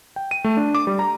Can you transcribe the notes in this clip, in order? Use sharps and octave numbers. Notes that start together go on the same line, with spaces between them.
G5
D#7
A3
D4
D6
G3
A#5